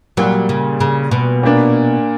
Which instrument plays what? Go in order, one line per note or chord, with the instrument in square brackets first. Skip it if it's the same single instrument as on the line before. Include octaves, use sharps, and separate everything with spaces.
[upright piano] A#2 G3 A#3 [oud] F#3
[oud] C#3
C#3
B2
[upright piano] A#2 A#3 D4